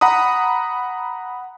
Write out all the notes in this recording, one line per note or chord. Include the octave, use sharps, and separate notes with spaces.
F#5 A#5 B5 D#6